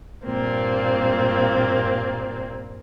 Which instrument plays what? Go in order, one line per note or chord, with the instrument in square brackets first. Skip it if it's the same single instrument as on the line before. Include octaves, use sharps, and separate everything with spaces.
[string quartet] G2 A#2 A#3 C4